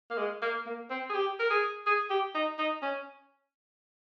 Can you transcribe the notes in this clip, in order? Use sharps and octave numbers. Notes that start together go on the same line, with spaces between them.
A#3
G#3
A#3
A#3
C4
G#4
G4
A#4
G#4
G#4
G4
D#4
D#4
C#4